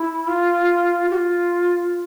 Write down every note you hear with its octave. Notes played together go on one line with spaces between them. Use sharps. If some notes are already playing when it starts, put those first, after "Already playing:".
Already playing: E4
F4
G4
F4